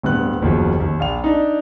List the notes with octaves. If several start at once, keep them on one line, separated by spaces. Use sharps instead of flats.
D1 G2 B3 F#6
F#1 D#2 B2 F3
D#2
A#1 F5 F7
D4 D#4